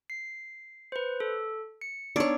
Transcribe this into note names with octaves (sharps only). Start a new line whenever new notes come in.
C7
B4 C5
A4
C#7
B3 D4 D#4 C#5 D5